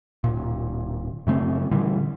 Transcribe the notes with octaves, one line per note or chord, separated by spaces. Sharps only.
D1 A#2
F#2 C#3 A3 C4
A#2 D3 E3 G3